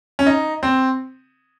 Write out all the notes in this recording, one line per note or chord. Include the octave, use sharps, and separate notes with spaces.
C#4
D#4
C4